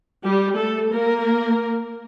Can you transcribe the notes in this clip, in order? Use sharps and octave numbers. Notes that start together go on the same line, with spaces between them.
G3 G4
A3 A4
A#3 A#4